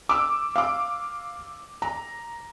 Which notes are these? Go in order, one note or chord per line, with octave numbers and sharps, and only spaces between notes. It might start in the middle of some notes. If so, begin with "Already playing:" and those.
D6 E6
F5 D6
A#5